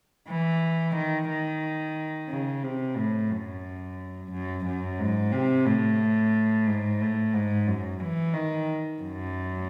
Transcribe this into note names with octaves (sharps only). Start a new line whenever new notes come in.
E3
D#3
D#3
C#3
C3
A2
F#2
F#2
F#2
G#2
C3
A2
G#2
A2
G#2
F#2
E3
D#3
F#2